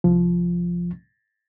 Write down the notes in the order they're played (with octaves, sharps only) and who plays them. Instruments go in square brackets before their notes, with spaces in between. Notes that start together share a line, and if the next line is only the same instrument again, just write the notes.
[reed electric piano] C2 F3